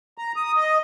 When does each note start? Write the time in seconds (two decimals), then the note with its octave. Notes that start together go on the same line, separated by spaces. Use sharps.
0.18 A#5
0.36 D#6
0.57 D#5